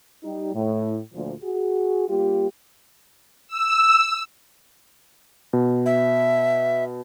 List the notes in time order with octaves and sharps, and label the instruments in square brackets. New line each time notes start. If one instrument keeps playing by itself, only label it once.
[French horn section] G3 D#4
A2
D2 A#2 F3
F#4 G#4
G3 A#3 F4 G4
[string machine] E6
[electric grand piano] B2
[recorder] E5